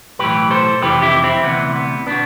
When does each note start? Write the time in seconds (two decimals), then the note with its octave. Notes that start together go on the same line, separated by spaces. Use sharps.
0.19 B1 A2 E3 G4 B4
0.51 A4 C5
0.81 F2 C3 E3 G4 B4
1.02 E4 G4
1.24 C4 E4
1.44 D2 C3 E3 B3
1.76 B3
2.07 B2 B3 D4